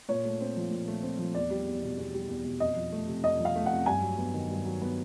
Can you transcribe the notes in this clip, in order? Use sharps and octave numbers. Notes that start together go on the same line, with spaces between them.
A#2 C#5
A3
C4
F3
A#2
A3
C4
F3
E2 D5
G3
E2
B2
E2
G3
E2
B2
F2 D#5
F3
A3
C3
F2 D#5
F3
F5
A3
C3 F#5
G2 G#5
F#3
B3
D#3
G2
F#3
B3